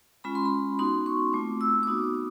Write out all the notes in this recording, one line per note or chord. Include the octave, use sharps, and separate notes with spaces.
G#3 C#4 F4 B5
C6
B5
B3 D#4 F#4 C6
C#6
A3 C4 F4 D6
E6
D6
B3 D#4 F#4 D#6
D6